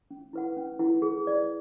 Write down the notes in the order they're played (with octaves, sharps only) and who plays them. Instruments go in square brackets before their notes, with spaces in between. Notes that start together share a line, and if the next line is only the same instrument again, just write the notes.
[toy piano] C#4
E4 B4 F#5
C#4
E4 B4 F#5
G#4
B4 D5